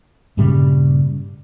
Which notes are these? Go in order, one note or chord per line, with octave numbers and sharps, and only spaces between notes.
G2 A#2 C#3 G3